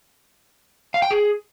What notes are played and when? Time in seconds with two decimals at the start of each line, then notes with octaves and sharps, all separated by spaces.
0.94 F5
1.02 G5
1.11 G#4